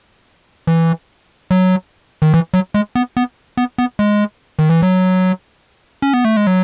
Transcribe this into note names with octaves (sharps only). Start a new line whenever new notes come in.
E3
F#3
D#3
E3
F#3
G#3
B3
B3
B3
B3
G#3
D#3
E3
F#3
C#4
B3
A3
G#3
F#3